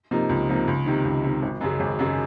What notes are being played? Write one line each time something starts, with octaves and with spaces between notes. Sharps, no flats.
C3 F3 A#3 D#4
C#2
C3 F3 A#3 D#4
C#2
C3 D#3
C#2
C3 D#3
G#1
F#2 C#3 G#3
G#1
F#2 C#3 G#3